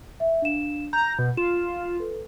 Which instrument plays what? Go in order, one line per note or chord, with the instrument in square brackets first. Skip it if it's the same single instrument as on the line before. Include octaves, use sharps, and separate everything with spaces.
[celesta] E5
D4 F5 E7
[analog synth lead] A#5 [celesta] G6
[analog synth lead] B2
[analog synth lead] F4 [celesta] E7
[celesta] A4 B4